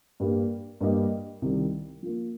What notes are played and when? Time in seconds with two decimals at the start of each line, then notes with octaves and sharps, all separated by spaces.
0.20 G2 G3 A#3
0.81 G2 G3 A#3 G4 D#5
1.42 C2 C3 D#3 G3
2.03 F3 A#3 F4